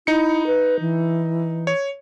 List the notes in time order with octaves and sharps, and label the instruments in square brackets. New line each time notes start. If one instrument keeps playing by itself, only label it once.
[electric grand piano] D#4 C#7 [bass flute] E4
[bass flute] B4
E3
[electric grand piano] C#5